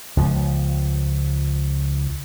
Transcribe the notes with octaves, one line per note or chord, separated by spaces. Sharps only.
C#2 F3